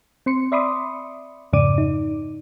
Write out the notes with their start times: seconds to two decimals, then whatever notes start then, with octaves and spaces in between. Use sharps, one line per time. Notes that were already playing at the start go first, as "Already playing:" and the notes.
0.26 C4 C6 C#7
0.52 D5 E5 B5 C6 D6 D#6
1.53 F2 G#2 C#3 D5 D6 D#7
1.78 D#4